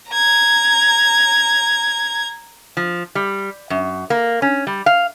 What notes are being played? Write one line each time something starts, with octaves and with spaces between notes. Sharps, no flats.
A#5 G#6
F3
G3
F#2
A#3
C#4
G3
F5